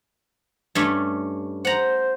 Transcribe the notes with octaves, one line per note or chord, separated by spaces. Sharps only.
G2 A3 C#4
C5 F#5 A#5